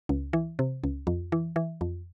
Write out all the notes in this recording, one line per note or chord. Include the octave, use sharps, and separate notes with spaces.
C#2
E3
C3
C#2
F2
E3
E3
F2